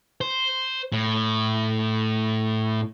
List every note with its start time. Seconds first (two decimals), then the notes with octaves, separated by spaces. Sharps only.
0.21 C5
0.92 A2